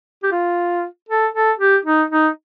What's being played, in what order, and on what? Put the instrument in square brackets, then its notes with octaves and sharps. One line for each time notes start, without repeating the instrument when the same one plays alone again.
[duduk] G4
F4
A4
A4
G4
D#4
D#4